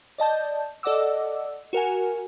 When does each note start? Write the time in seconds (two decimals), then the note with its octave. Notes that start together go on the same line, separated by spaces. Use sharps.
0.18 D5 D#5 A5 G6
0.83 A4 D5 D#5 F#5 D6 E6
1.73 F#4 A#4 F#5 G#5